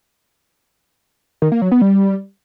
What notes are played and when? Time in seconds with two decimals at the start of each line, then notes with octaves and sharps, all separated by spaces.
1.42 D#3
1.52 A#3
1.62 F#3
1.72 B3
1.81 G3